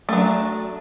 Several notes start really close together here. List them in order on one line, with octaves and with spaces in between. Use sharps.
A3 F#3 D4